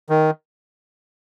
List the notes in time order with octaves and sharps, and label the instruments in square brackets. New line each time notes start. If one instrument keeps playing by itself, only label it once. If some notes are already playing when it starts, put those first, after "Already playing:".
[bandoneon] D#3